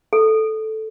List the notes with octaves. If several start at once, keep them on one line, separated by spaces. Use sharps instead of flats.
A4